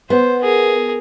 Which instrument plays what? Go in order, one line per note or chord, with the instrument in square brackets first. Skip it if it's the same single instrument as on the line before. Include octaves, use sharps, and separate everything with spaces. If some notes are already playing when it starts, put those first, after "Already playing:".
[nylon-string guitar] B3 [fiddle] C5
[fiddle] G#4 A#4